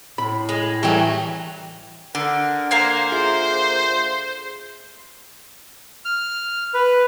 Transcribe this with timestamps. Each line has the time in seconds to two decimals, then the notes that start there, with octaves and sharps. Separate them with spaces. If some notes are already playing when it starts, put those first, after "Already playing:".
0.18 A2 B5
0.49 G#3
0.83 E3 F#3 G3 A3 G5
2.15 D3 A#4
2.71 A#3 C5 F5 G#5
3.12 F4 G#4 E5
6.05 F6
6.74 B4